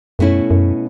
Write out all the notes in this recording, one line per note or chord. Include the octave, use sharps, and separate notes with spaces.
F#2 B2 A3 C#4 E4
F#2